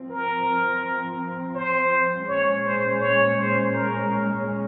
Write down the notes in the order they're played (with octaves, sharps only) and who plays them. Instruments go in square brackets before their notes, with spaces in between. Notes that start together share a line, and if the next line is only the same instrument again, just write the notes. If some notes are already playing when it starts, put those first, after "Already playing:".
Already playing: [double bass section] F3 C4
[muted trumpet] A#4
C5
[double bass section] A#2 G#3 C#4 [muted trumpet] C#5
[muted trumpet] C5
C#5
C5
A#4